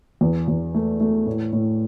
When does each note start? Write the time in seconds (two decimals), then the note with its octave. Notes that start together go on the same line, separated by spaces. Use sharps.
0.21 E2
0.48 E2
0.74 A3
1.00 A3
1.26 A2
1.53 A2